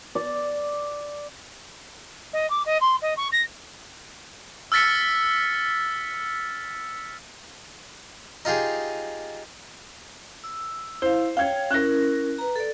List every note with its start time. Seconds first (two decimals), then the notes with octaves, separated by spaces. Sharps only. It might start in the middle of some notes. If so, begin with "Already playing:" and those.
0.15 D5
2.33 D#5
2.50 D6
2.65 D#5
2.81 C6
3.02 D#5
3.17 C#6
3.32 A#6
4.72 E6 F6 A6 B6 C#7
8.45 D#4 F4 G4 G#4
10.44 E6
11.02 E4 C5 F5
11.37 C#5 F5 G5 G#6
11.71 C#4 E4 A#4 F#6 A#6
12.38 B4 A#5
12.56 A4 D5